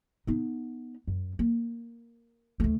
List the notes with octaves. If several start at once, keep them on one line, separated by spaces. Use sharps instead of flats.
B3 D#4
F#2
A#3
D2 A3